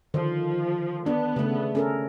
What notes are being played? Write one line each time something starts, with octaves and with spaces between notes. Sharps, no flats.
D3 D#3 F3 C5
B3 D4
C#3 A3
C#4 A4 A#4